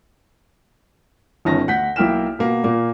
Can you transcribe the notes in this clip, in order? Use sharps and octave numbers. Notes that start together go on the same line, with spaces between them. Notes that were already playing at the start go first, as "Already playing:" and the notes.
G1 D#3 C#4 A5 A#6
D2 F#5 G6 B6
B1 A#3 E4 G5 F6 E7
B2 A#3
A#2 A#3